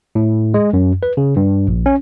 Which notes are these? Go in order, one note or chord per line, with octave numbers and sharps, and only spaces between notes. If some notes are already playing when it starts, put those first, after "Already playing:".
A2
G#3
F#2
B4
C#3
G2
A#1
C#4